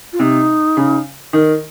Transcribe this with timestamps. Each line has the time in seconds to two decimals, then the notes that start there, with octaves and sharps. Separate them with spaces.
0.13 F4
0.19 C3 D#4
0.77 C#3
1.33 D#3